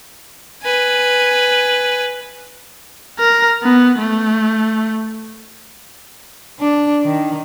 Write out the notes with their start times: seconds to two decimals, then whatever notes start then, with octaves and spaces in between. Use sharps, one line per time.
0.63 B4 G#5
3.19 A#4
3.63 B3
3.99 A3
6.60 D4
7.04 D#3